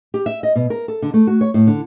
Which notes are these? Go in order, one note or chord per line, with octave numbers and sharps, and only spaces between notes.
G4
E5
D#5
B2
A#4
A4
D3
A3
F#4
C#5
A2
D3